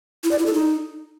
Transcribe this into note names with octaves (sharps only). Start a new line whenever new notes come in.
E4
D5
E4
A4
D#4